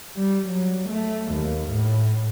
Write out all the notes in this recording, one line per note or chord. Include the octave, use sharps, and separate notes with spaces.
G3
F#3
A3
D#2
A2